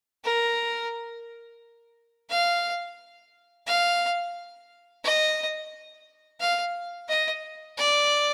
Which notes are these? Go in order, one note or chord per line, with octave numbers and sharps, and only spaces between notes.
A#4
F5
F5
D#5
F5
D#5
D5